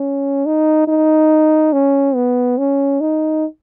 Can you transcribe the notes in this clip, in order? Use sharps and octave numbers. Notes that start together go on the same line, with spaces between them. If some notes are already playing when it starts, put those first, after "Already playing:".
Already playing: C#4
D#4
D#4
C#4
B3
C#4
D#4